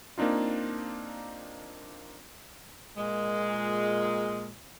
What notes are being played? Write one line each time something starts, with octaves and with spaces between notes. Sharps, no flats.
A#3 C4 D4 D#4 F4
A#2 G#3